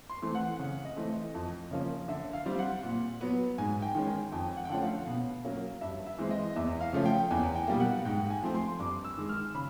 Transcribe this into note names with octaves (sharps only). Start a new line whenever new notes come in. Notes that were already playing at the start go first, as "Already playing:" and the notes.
C6
E3 A3 C4
F#5
C#3
D#5
E3 A3 C4
D#5
F2
C#3 F3 A#3 C#4
D3 E5
F5
G3 C4
F#5
A#2
F#3 B3
G#2 G#5
G5
D#3 G#3 C#4
G#5
F2 G5
F#5
G5
D3 F3 A3 C#4 F#5
F5
B2
F#3 A#3 C#4
G2 E5
E5
E3 G#3 C4
D#5
E2 E5
F5
C#3 F3 A3 C#4
G5
E2 G#5
G5
B2 G3 A#3
F#5
G#2 G5
G#5
F3 A3 C4
C6
G2 D6
E6
D#3 G#3
F6
C#3 B5